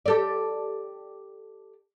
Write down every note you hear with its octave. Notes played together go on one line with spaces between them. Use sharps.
G4 A4 D5